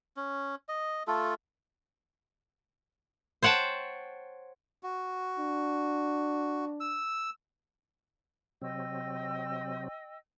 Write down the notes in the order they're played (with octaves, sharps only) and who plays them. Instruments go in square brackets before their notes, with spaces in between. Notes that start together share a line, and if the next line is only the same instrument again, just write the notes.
[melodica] C#4
D#5
A3 F4 A4
[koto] C5 C#5 F#5 G5 A5
[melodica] F#4
[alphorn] D4
[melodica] E6
[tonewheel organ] C3 F#3 C4 [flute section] D#5 G5 E6